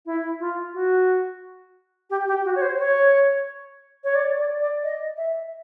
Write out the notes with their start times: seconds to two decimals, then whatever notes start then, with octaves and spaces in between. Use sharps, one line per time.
0.06 E4
0.40 F4
0.74 F#4
2.10 G4
2.27 G4
2.45 F#4
2.56 C#5
2.62 C5
2.79 C#5
4.04 C#5
4.15 D5
4.38 D5
4.60 D5
4.84 D#5
5.17 E5